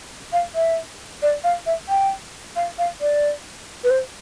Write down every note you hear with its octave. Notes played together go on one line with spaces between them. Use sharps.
F5
E5
D5
F5
E5
G5
F5
F5
D5
B4
C5